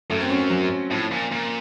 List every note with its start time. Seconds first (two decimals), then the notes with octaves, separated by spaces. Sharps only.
0.10 F#2 A3
0.21 C4
0.30 C#4
0.40 C#4
0.50 F#3
0.90 A2 F3
1.12 A#2
1.32 A#2